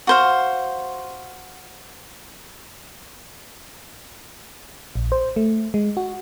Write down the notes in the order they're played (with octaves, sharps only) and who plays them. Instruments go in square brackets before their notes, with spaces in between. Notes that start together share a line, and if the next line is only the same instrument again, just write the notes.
[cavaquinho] F#4 C5 F5
[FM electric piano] A#1
C5
A3
G#3
F#4